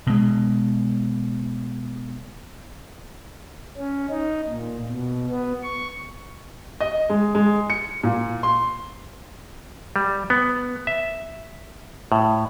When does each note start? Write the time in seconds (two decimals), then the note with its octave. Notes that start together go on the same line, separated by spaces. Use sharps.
0.07 B2 G#3
3.77 C#4
4.10 D#4
4.49 A#2
4.89 B2
5.31 B3
5.63 C#6
6.80 D#5
7.10 G#3
7.35 G#3
7.70 C#7
8.03 A#2
8.43 C6
9.96 G3
10.30 B3
10.87 E5
12.12 A2